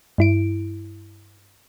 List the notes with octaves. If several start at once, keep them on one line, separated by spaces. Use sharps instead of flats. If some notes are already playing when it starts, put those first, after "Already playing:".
G2 E4 D7